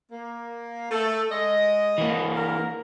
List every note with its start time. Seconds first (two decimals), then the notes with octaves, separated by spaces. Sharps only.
0.11 A#3
0.91 A3 A4
1.31 G#3 D#5
1.98 E3 A#3
2.37 A#4